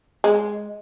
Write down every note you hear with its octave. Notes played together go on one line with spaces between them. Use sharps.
G#3